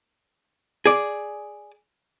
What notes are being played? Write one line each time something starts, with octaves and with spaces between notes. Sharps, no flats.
G#4 D5